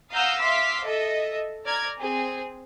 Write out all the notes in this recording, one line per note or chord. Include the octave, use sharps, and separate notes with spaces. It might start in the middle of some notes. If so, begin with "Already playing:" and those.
F5 F#5 A#5 D#6 E6 G6
E5 F5 C6 D6 B6
A4 D#5 E5
D5 A#5 F6 G#6
C4 G#4